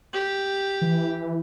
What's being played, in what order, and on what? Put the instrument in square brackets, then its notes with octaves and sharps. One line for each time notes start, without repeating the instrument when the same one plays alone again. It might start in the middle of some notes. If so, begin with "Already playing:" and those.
[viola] G4
[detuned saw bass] E3